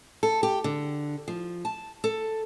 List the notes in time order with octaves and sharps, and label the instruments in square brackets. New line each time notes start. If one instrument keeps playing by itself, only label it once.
[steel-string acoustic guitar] A4
G4
D3
F3
A5
A4